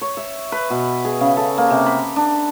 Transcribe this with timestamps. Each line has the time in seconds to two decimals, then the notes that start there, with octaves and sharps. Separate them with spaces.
0.01 C#5
0.17 E5
0.52 B4
0.70 B2
1.05 G#4
1.21 C#3
1.37 A4
1.58 A#3
1.70 C3
1.86 B5
2.16 D4